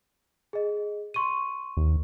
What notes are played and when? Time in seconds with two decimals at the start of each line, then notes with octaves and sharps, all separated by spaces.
0.53 G#4 D#5
1.14 C6 C#6 D#7
1.77 D#2